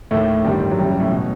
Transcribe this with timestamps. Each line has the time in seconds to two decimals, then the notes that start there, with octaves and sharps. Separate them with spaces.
0.11 D#2 A2 D#3 A3
0.45 G1 G2 D#3 G3
0.71 F#3
0.78 F#1 F#2 E3 G3
0.89 G3
1.00 A2 A3
1.12 B2